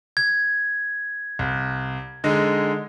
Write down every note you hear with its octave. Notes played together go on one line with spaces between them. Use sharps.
G#6
C2
D3 G#3 D#4